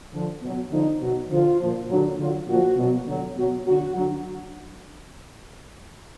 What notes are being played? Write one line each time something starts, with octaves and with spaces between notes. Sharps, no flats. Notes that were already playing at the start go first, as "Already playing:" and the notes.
D3 F3
B2 F#3
D3 F3 D#4
B2 F#3
D3 F3 F4
A#2 F3
D3 F#3
D3 F#3 F4
A#2 F3 F#4
B2 F#3
D3 F#3
B2 F#3 F#4
D3 F#3 F#4
D3 F#3